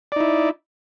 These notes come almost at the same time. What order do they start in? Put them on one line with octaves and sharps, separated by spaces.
D5 D#4 E4